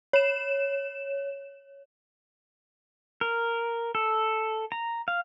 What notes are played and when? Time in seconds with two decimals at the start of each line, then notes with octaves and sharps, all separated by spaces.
0.13 C#5 E7
3.21 A#4
3.95 A4
4.72 A#5
5.08 F5